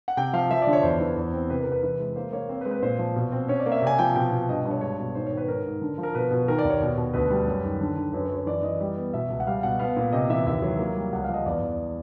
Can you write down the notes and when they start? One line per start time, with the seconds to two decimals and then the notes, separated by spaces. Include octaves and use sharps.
0.08 F#5
0.17 C3 G5
0.33 F3 F5
0.51 F3 E5
0.62 D5
0.67 D3
0.73 C#5
0.83 E2 C5
1.01 E3
1.16 E2
1.33 C4
1.50 C3 B4
1.61 A#4
1.67 C3 B4
1.83 E3 B4
2.00 G#3
2.16 A#3 C5
2.33 A#3 C#5
2.49 C4 C5
2.61 B4
2.65 G#3
2.71 B4
2.82 A#2 C5
2.99 F3
3.16 B2
3.32 C4
3.48 C#4 C#5
3.60 D5
3.66 A#3
3.72 E5
3.82 C3 G#5
3.99 F3 G5
4.15 B2 G5
4.31 B2
4.49 G2 D#5
4.65 G2
4.71 C#5
4.81 G#3 C#5
4.98 B2
5.15 G#2 C5
5.27 C#5
5.32 D#3
5.37 B4
5.48 G#2 A#4
5.65 G#2
5.82 D3
5.98 F3
6.03 A#4
6.14 B2 B4
6.31 B2
6.48 D#3 A#4
6.59 D5
6.65 D#2
6.70 C#5
6.82 B2
6.97 B2
7.14 D2 B4
7.30 G3
7.47 F#2
7.64 D#3
7.81 D3
7.96 D3
8.13 F#2 B4
8.25 C#5
8.30 F#2
8.36 C#5
8.46 E3 D5
8.63 E3 D#5
8.81 G3
8.97 B3
9.14 B2 E5
9.30 C#2
9.40 F#5
9.47 G3 F5
9.63 B2 F#5
9.79 B3 F5
9.96 A#2
10.12 C3 D#5
10.30 E3 E5
10.46 D#2 E5
10.62 F#3
10.79 A#3
10.96 G3
11.12 C#2 F#5
11.24 F3 F5
11.34 D#5
11.46 E2 D5
11.62 E2